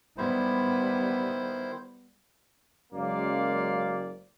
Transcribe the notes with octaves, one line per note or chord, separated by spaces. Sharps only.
D#3 G3 B3 E4 C5
F#1 F#2 G#3 A#3 D5 F5